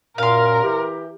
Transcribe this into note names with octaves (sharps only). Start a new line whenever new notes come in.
F#2 A#2 A#4 F5 C6
E3 G4